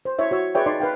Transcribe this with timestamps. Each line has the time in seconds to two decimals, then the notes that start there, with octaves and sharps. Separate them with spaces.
0.05 C5
0.19 E4 C#5 E5
0.31 F#4 C#5 E6
0.55 G#4 B4 C#5 D5 E5 G5
0.66 D#4 D5 C6
0.80 B4 F5 G5